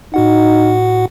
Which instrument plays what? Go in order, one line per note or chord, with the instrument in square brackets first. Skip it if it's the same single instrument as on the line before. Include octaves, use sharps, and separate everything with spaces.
[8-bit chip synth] A2 F#4 F#5 [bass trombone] D#4